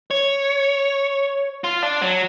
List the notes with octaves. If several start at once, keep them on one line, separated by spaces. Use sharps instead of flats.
C#5
F4
D4
F#3